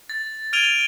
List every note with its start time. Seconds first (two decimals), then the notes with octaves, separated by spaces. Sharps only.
0.10 A6
0.53 F6 G#6 D7 D#7 F7 G7